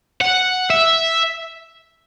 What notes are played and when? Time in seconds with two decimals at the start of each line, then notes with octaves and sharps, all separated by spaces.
0.21 F#5
0.70 E5